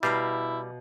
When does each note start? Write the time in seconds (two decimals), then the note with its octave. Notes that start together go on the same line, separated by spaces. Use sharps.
0.03 B2 G3 E4 F5 A#5